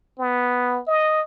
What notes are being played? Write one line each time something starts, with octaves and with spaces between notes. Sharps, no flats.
B3
D#5